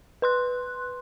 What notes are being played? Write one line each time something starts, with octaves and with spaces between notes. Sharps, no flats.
B4 C6 F#6